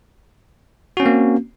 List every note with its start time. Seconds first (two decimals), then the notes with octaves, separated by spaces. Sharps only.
0.97 F#4
1.00 C#4
1.03 C4
1.06 A#3